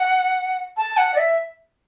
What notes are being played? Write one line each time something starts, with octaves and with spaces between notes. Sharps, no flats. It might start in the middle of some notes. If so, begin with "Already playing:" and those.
Already playing: F#5
A5
F#5
D5
E5